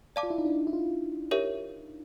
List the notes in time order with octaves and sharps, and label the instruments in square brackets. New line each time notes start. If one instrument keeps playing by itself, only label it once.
[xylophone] D5 F5 A5 D6
[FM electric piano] F4
E4
D#4
D4
E4
F4
[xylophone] G4 A#4 C#5 E5